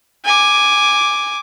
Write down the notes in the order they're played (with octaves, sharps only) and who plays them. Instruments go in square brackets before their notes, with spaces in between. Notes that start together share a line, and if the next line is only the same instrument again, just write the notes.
[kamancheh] G#5 D6